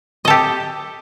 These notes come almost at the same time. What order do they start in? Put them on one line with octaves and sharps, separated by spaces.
D#5 A4 G4